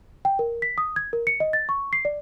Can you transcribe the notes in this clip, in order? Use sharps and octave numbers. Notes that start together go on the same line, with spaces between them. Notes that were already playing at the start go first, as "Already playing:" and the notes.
G5
A#4
B6
D#6
G#6
A#4
C#7
D#5
A6
C#6
C7
D5